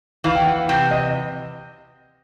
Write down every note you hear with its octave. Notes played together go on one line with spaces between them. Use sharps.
E3 F5
G5
F#5
C3 G5
D#5